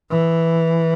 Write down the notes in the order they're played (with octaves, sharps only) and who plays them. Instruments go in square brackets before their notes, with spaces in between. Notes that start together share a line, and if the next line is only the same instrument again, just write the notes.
[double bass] E3